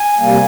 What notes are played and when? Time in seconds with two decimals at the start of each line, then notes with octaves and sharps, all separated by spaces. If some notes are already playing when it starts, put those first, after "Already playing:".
Already playing: G#5
0.19 C3 G3 A#3